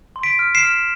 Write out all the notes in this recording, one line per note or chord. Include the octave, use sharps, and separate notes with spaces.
C6
B6 D7
F6
C7 E7
F6